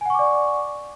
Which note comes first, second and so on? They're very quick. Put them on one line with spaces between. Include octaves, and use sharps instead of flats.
G#5 F#5 C#6 D6 D5